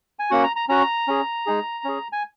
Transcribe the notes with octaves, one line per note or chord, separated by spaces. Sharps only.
G#5
A#3 C#4 F#4 F#5
A#5
A#5
C#4 F#4 A#5
C#4 G#4
G#3 D#4 G#4
C#4 G#4
G#5